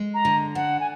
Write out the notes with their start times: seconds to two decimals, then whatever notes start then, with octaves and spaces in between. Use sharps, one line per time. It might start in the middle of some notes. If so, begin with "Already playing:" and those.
Already playing: G#3
0.14 A#5
0.25 D3
0.55 D4 F#5
0.80 G#5